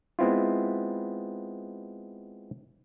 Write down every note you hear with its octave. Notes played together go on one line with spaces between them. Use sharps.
G#3 B3 C4 E4 F4